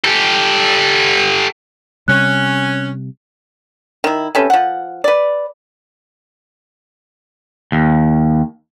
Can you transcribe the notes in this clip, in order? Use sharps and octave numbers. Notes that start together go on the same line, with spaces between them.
G4 A4
C3 G3 C#4 F#6
D#3 E4
C3 C#4 A4 B4
F3 F#5
B4 D5
D#2